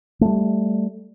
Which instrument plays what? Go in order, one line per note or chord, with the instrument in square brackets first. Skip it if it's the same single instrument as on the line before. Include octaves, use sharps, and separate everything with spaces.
[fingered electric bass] G3 A3